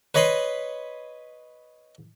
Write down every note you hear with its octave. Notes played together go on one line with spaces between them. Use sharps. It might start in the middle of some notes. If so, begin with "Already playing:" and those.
B4 C#5 D#5 B5 C6